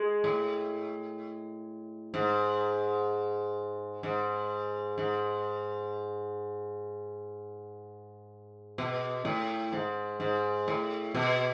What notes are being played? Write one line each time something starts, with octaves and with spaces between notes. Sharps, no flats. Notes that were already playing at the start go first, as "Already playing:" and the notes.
Already playing: G#3
A2
G#2
G#2
G#2
B2
A2
G#2
G#2
A2
B2